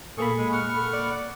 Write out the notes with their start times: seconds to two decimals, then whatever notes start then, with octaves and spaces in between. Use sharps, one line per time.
0.18 A#2 A#3 G#4 A4 B5 C#6
0.38 G#3
0.52 F#5 C#6 F6
0.76 A4
0.93 D5